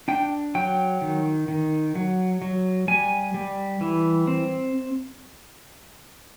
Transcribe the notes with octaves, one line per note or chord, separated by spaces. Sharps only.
D4 G5
F#3 G5
D#3
D#3
F#3
F#3
G3 G#5
G3
E3
C4